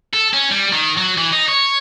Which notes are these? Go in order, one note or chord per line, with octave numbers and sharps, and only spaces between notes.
A4
C#4
G3
D#3
F#3
E3
D#4
C#5